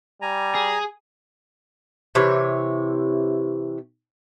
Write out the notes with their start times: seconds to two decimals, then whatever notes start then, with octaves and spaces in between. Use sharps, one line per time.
0.22 G3 G#5 A#5
0.55 G#4
2.15 C3 E3 C#5